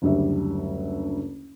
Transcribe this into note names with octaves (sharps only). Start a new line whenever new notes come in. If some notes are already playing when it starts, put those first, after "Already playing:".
F#1 D2 G3 E5